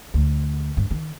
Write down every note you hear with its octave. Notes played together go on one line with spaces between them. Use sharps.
D2
G2
D#3